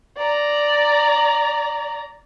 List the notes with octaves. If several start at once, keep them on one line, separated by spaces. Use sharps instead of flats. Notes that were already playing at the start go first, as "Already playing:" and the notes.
D5 A#5